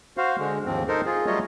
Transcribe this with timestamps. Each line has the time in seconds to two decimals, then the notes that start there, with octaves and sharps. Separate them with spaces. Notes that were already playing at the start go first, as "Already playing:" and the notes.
0.17 F#4 C5 F5
0.38 D3 G#3
0.66 D#2 G#2 F3 C4
0.88 D#4 A4 A#4 C5
1.06 F4 G#4
1.26 F#3 G3 A3 F4 C#5 D#5